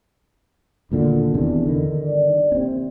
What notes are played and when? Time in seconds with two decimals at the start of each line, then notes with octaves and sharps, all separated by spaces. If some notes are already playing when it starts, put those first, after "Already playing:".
0.92 D2 A#2 D3 D#3 D4
1.34 E1 E2 C3
1.67 D3 D#3
2.01 G1 D5
2.52 D#2 C3 C4 C#4